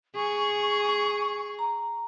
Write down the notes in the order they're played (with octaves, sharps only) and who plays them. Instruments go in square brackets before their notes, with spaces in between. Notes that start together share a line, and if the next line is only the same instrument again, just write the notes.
[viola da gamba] G#4 [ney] C#6
[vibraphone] A#5